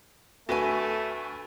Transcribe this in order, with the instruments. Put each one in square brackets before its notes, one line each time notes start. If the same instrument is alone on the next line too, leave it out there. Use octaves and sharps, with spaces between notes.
[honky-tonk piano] D2 B4 D#7 [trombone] A3 [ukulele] F#4 G#5